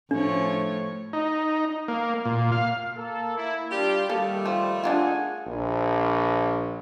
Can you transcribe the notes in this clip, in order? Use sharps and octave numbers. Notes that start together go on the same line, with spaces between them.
A2 F3 D4 C#5
D#4
A#3
A#2
F5
A#3 A4
A#3 E4
G3 D4 F4 G4
D#3 G3 A3 A#3 A4
F3
D4 E4 F4 G#4 F#5 G#5
A#1